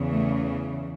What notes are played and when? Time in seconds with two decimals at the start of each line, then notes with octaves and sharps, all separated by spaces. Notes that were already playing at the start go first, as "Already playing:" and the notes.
Already playing: E2 C#3 E3
0.11 A3